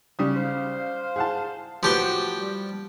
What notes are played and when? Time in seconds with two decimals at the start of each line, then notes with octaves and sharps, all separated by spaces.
0.19 C#3 G3 D#6
0.36 C5 F5
1.16 G#4 F#5 A5
1.83 A2 F3 F#3 F#4 G4 B4 G5 C6
2.39 G3